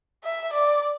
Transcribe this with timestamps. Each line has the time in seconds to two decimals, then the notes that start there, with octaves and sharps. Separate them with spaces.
0.24 E5
0.53 D5